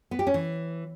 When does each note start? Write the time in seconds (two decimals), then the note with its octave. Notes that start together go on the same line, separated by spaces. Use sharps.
0.11 B3
0.19 G4
0.27 C#4
0.34 E3